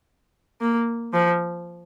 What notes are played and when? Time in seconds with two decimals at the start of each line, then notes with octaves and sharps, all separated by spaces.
0.61 A#3
1.13 F3